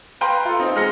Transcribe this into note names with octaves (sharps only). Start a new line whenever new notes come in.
B4 F5 G5 A#5 C6
F4 A4
C4 D#4
G#3 F6 A#6 C#7